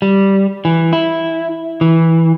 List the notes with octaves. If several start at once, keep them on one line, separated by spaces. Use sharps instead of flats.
G3
E3
E4
E3